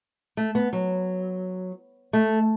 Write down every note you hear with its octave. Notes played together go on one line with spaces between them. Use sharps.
A3
B3
F#3
A3